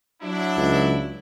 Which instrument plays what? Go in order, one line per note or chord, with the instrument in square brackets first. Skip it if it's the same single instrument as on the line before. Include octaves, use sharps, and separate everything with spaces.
[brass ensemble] F#3 D4 E4
[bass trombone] C#2